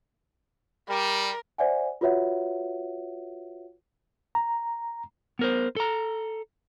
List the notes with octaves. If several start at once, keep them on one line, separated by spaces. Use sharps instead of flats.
G3 A#4
C5 D5 E5 F#5 G#5
F4 F#4 B4 C#5 E5 F#5
A#5
B3 A#4 C5
A4 A#5